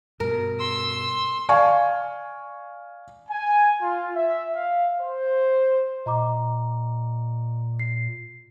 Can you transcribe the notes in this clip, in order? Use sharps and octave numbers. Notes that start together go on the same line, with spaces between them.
G2 B2 A#4
C6 E6
D5 F5 G#5 C#6
G#5
F4
E5
F5
C5
A#2 D#5 A#5 D6
C7